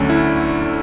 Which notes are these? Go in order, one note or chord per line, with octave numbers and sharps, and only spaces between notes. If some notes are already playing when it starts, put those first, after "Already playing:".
Already playing: D2 D3 F#3 A3 C#4 D4
E4